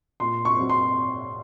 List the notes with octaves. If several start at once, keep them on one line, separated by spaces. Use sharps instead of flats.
A#2 C6
C#6
F#3 C4
C6